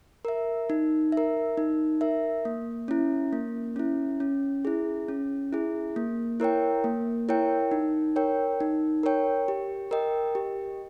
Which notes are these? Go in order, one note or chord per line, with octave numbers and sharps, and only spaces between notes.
A#4 E5
D#4
A#4 E5
D#4
A#4 E5
A#3
C#4 E4
A#3
C#4 E4
C#4
E4 G#4
C#4
E4 G#4
A#3
E4 A#4 C#5 G5
A#3
E4 A#4 C#5 G5
D#4
A#4 C#5 G5
D#4
A#4 C#5 G5
G4
A#4 D#5 G5
G4